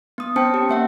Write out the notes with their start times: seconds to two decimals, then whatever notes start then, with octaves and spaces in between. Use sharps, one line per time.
0.18 B3 D#6
0.36 C4 C#4 C5 G5 A5 C#7
0.54 G4
0.69 A#3 E5 F#5